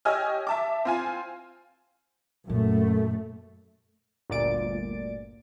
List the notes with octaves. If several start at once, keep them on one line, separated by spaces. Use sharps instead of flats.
G4 C#5 D#5 G#5 E6 F6
E5 A5 D6
C4 F4 G#5
F#2 A#2 A3
G1 D2 A#2 D5 A6 D7